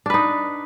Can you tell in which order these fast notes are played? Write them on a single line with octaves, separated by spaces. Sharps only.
D4 B4 D#4